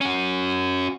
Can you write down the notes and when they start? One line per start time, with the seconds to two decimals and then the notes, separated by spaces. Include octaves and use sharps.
0.01 C#4 F#4